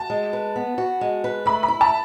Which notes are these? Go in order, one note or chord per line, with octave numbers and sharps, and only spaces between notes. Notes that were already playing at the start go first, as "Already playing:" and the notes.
Already playing: F#4 A5
G#3
B4
B3
F#4
G#3
B4
A3 B5
B5
E4
A5